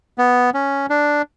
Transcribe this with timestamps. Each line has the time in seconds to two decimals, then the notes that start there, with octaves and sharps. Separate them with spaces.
0.18 B3
0.54 C#4
0.90 D4